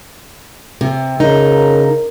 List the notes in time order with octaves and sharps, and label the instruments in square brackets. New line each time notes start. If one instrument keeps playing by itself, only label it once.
[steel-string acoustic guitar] C3
[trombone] C#3 [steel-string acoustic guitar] D#4 [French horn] A#4